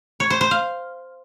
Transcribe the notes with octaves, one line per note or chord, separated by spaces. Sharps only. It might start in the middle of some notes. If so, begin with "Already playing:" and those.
C#5
C5
C5
F5